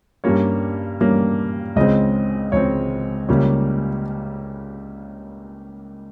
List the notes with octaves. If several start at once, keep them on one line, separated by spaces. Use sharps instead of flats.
G2 G3 A#3 C#4 C#5
G2 G3 A#3 C#4
C#2 C#3 G#3 C4 D#5
C#2 C#3 G#3 C4 C#5
C#2 C#3 G3 A#3 C#4